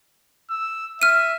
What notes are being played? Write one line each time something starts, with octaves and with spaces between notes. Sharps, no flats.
E6
E5 F6 D#7